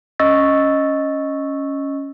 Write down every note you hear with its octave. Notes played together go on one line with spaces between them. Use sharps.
C#4 D#5 C#6 E6 A6 A#6